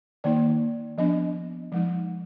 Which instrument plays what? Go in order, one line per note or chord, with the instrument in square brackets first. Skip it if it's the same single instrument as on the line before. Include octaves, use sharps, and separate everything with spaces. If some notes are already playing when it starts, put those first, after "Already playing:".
[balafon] D#3 A#3 D#4 D5
F3 B3 D4 D#5
F3 G#3 D#4